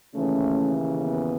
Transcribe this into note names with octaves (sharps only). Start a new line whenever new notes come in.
D#2 C#3 E3 A3 C#4
B3